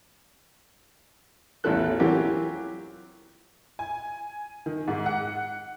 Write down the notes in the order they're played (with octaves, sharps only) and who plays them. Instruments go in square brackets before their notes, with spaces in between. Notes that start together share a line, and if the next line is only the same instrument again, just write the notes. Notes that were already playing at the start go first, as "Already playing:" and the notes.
[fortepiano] A1 E2 E4 F4 A4 F#6
E3 F#3 C4 F4 G4 A#4
[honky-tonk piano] G#5
D#3
G#2
F#5